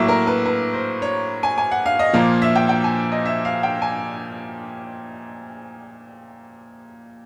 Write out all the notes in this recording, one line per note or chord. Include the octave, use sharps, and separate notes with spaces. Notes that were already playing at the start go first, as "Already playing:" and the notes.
Already playing: A2 F#3 A#3 E5
A#4
B4
B4
C5
C#5
G#5
G#5
F#5
F5
D#5
A#2 F3 A#3 F5
E5
G5
G5
G#5
D#5
E5
F5
G5
G#5